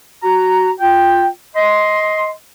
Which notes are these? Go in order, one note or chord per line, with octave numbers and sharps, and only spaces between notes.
F#4 A#5
F4 G5
D#5 C6